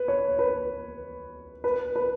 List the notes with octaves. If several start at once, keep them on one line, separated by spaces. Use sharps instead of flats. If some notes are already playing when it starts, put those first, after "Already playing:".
Already playing: B4
C#5
B4
B4
B4